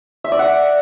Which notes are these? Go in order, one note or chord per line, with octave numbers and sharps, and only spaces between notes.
E5
D5
F#5